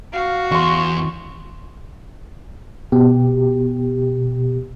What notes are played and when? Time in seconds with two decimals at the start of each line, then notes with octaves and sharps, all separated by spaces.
0.13 F#4 F5
0.51 E2 C6 C#6
2.92 B2 G4